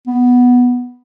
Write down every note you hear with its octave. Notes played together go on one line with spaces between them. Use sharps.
B3